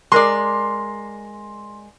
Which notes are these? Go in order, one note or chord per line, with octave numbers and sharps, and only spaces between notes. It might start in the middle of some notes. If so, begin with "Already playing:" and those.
G#3 A#4 D5 C6